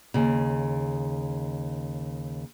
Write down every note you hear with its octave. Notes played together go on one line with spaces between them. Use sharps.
D#2 C#3